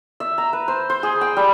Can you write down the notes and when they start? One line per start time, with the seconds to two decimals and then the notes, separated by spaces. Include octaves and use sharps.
0.20 E5
0.38 A#5
0.53 B4
0.68 C5
0.90 C5
1.03 G#4
1.21 G5
1.37 G3